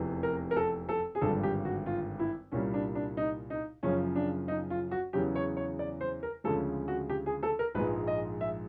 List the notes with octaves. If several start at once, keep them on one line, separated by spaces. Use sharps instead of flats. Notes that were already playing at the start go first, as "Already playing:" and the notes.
Already playing: F1 E2 C3 E3
A#4
A#4
A4
A4
G#4
G#1 G2 D3 F3 A4
G4
F#4
F4
E4
C2 A#2 G3 C#4
D4
D4
D#4
D#4
F#1 F#2 C#3 F3 C#4
D4
D#4
F4
F#4
E2 C#3 F#3 G4
C#5
C#5
D5
C5
A#4
D2 C#3 F3 G#3 A4
F#4
G4
G#4
A4
A#4
A#1 G#2 F3 G#3 B4
D#5
E5